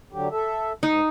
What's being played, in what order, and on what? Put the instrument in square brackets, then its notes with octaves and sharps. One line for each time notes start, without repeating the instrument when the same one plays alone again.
[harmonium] D3 F#3 G4
A4 E5
[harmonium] G#2 [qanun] D#4